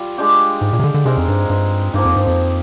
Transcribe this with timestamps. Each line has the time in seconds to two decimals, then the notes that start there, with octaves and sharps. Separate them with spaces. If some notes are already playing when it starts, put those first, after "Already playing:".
Already playing: G3 F4
0.18 G#3 D4 G4
0.61 G#2
0.73 A#2
0.79 C3
0.84 D3
0.94 D3
1.05 C3 G#3 C4 D#4 A#4
1.17 F2
1.28 G2
1.50 G2
1.93 G2 F3 A#3 D#4
2.05 F2
2.16 G2
2.27 F2